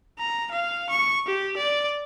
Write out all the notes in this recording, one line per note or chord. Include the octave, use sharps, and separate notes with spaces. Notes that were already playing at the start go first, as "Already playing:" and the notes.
A#5
F5
C#6
G4
D5